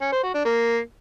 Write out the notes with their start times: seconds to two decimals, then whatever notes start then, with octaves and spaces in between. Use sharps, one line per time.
0.01 C#4
0.12 C5
0.23 F#4
0.34 D4
0.45 A#3